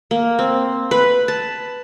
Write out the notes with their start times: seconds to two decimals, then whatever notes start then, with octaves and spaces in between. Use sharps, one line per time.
0.11 A#3
0.39 C4
0.91 B4
1.28 A5